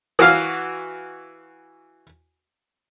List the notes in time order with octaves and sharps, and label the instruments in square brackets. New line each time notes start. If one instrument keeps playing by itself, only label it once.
[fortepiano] E3 F#4 F5 F6